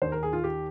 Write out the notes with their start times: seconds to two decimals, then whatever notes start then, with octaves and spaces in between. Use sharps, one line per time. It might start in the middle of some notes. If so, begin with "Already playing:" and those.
0.02 D#2 D#3 C5
0.12 A#4
0.23 G#4
0.33 F4
0.44 G4